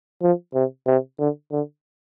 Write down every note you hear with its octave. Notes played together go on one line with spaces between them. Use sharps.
F3
C3
C3
D3
D3